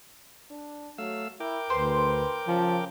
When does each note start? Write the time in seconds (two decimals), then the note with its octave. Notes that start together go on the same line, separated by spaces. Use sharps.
0.50 D4
0.98 F#3 A3 F5 E6
1.40 E4 A#4 G5 D6
1.70 D2 B4 C5 C6
2.47 C#3 F3